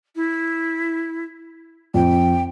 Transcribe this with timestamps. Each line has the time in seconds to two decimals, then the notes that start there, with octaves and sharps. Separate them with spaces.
0.15 E4
1.94 F2 G5